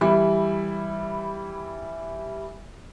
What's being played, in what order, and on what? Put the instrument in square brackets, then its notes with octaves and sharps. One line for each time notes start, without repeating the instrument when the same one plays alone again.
[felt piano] E3 G3 E4